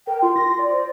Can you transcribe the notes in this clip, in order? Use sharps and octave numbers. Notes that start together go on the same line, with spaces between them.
A#4 G5
F4 C6
A#6
D5
C5